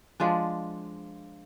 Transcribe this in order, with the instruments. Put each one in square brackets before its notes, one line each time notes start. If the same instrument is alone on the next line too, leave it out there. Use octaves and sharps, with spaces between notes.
[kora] F3 G#3 D4